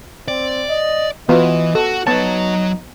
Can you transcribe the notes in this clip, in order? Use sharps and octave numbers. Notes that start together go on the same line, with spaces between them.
C4 D5
D#5
E3 B3 F4 F#4 D#5
F#4 A4
F#3 B3 D#4 C#5 A5